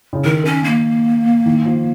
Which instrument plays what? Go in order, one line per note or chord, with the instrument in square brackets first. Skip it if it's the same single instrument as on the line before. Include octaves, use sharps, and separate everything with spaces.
[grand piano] C#3
[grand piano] D#3 [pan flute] A#4
[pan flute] C#4
A#3
[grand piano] D#3
F3